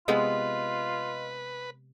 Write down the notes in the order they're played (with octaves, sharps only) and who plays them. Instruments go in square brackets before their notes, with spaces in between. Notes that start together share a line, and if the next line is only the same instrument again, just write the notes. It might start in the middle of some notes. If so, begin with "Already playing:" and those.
[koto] C3 G#3 B3 [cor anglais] F4 [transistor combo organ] B4 [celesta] D#5